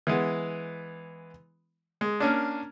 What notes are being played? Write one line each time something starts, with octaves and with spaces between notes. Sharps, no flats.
E3 G#3 B3
G#3
A#3 C#4 D4